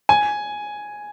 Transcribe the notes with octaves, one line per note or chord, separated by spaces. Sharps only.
G#5